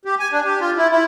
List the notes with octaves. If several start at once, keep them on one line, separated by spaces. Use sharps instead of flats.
G4
G#5
D4
G4
F4
E4
E4